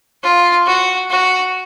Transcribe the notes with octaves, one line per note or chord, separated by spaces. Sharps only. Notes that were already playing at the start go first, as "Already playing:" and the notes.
F4
F#4
F#4